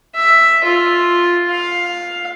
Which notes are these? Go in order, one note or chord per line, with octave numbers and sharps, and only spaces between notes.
E5
F4
F5